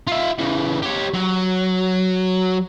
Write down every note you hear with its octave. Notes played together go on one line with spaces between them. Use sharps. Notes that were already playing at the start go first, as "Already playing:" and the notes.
F4 E5
C#3 E3
G4 C#5
F#3